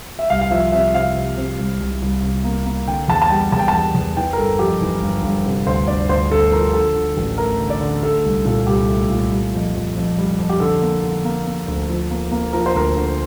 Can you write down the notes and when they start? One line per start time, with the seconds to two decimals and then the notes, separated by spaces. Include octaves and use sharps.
0.19 E5
0.30 C2 F5
0.41 F5
0.51 F3 E5
0.72 C3 E5
0.94 C3 F5
1.15 C3
1.37 C3
1.59 C2
1.81 C2
2.02 C2
2.22 C3
2.44 A#3
2.66 A#3
2.87 D3 G5
3.08 E2 A5
3.22 A5
3.30 G3 G5
3.52 E2 A5
3.59 G5
3.68 A5
3.73 E2
3.95 E2
4.17 E3 G5
4.33 A#4
4.38 G1 A4
4.59 F2 G4
4.81 E3
5.02 G1
5.23 G1
5.46 C3
5.67 D2 C5
5.88 D2 D5
6.09 D2 C5
6.31 D2 A4
6.52 F3 A#4
6.73 D3 A4
6.95 D3
7.17 A1
7.38 A3 A#4
7.60 D3
7.70 D5
7.81 D3
8.02 A3 A4
8.25 C2
8.45 A#2 A4
8.67 C2 G4
8.89 A3
9.10 A#2
9.32 G3
9.54 F2
9.75 F2
9.96 F2
10.17 G3
10.39 F2
10.49 G4
10.60 D3 A4
10.82 A#3
11.03 D3
11.25 A#3
11.47 A#3
11.68 D2
11.90 F3
12.11 A#3
12.31 A#3
12.53 F3 A#4
12.66 C5
12.75 D2 A#4
12.97 D3